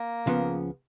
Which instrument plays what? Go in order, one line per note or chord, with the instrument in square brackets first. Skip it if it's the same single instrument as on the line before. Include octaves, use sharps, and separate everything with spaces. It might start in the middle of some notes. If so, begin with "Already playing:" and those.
Already playing: [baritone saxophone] A#3
[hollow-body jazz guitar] C#2 C#3 F3 B3